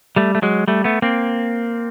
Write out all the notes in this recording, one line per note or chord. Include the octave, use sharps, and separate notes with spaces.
G3 A3
A3
F#3 G#3
G3 A3
A3 B3
A#3 C4